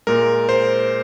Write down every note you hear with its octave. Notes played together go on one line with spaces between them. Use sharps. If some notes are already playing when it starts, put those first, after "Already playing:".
A#2 G#3 A#4
C5